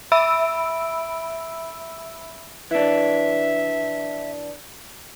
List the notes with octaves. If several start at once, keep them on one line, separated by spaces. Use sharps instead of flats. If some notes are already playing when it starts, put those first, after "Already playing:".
E5 B5 E6 D7
E3 D4 E5